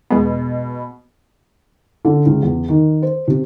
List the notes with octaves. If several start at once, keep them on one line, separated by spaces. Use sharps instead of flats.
E2 B2 G#3 B3
D3
C#2
E2
D#3
C5
C3